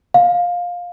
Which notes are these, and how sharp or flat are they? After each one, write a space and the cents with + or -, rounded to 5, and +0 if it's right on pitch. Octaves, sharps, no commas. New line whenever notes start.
F5 +15